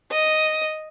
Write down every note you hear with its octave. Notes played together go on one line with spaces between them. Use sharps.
D#5